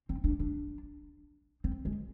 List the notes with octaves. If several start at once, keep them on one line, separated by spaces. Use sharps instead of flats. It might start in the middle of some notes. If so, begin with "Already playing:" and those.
C4
D4
D4
C4
G#3